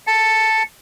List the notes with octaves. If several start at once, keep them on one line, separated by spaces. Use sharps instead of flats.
A5 C#7